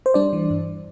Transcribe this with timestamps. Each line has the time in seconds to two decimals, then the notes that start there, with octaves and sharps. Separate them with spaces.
0.06 C5
0.14 G3 D4 D5
0.33 E3
0.50 G2